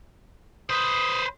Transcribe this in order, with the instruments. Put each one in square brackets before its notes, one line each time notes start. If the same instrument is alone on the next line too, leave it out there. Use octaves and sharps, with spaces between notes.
[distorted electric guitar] B4 C5 [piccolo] D#6